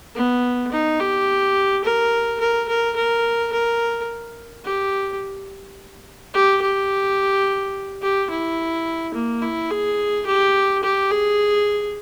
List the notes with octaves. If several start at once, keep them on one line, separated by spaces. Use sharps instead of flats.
B3
D#4
G4
A#4
A#4
A#4
A#4
A#4
G4
G4
G4
G4
E4
A#3
E4
G#4
G4
G4
G#4